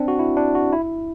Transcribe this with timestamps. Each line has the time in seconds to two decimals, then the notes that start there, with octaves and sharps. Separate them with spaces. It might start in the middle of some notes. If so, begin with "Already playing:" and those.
Already playing: C4 D4
0.08 F#4
0.19 E4
0.37 D4
0.55 F#4
0.73 E4